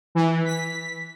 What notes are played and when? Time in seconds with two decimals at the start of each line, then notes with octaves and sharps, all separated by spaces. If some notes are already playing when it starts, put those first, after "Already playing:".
0.15 E3
0.45 B6